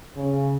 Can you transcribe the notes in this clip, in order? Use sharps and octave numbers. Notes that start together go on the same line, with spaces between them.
C#3